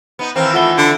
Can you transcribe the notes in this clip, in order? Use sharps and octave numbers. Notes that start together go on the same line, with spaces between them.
B3 D#4
D#3 E3 C4 A#4 F5 G5
A3 F4 A4 F#5 B5 G7
D3 D5